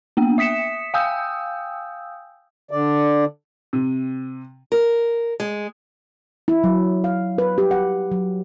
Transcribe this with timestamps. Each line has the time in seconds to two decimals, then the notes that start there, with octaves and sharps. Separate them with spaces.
0.17 A#3 B3 D4 G5
0.38 E5 D#6 B6 C#7 E7
0.94 F5 G5 G#5 D#6 E6 G6
2.71 D3 D5
3.73 C3
4.72 A#4
5.40 G#3
6.48 E4
6.64 F#3
7.04 F5
7.38 B4
7.58 G4
7.71 F#5
8.12 F#3